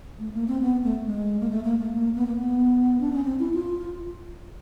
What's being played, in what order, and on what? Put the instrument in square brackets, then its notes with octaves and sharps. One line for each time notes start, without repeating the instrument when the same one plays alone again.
[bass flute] A3
A#3
C4
B3
A3
G#3
A#3
A3
A#3
A3
A#3
B3
A#3
B3
D4
C#4
C4
E4
F4